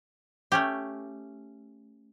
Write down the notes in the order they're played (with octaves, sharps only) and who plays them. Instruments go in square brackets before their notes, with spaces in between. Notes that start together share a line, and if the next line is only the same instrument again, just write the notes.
[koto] A3 C#4 G4